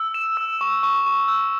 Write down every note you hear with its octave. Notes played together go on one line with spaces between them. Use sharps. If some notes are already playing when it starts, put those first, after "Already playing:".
Already playing: E6
E7
E6
C#6
C#6
C#6
E6